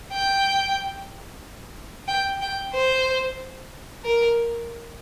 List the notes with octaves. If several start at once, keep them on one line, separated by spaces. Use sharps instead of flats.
G5
G5
G5
C5
A#4